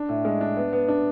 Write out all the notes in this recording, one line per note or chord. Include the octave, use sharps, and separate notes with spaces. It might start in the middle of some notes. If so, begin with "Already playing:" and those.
Already playing: D4
A2
G#3
D4
B3
B3
D4